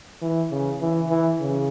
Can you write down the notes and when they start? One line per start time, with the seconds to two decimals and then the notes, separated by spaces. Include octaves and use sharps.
0.21 E3
0.51 C#3
0.80 E3
1.09 E3
1.39 C#3